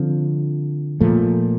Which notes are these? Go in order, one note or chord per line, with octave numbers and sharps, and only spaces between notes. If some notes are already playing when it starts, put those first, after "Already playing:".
Already playing: D3 F3 C4
A#2 F3 A3